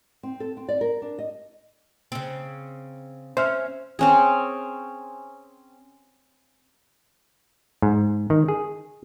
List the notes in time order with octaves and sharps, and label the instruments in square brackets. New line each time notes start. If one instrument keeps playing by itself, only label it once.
[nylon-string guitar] C4
A4
C4
D5
A#4
D4
D#5
[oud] C#3 C4
[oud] C#4 [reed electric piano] C5 E5 F6
[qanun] C4 C#4 G#4
[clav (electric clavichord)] G#2
D#3
G#4